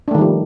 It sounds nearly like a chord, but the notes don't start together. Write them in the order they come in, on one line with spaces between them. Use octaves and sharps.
D4 A3 D#3 G3 F3